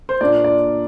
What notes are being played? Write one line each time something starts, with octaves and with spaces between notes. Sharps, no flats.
C5
A#2 A#3 D4 F4 D5
D5